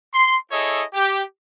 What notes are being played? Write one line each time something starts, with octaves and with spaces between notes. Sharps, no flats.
C6
E4 G#4 A4 C#5 D#5
G4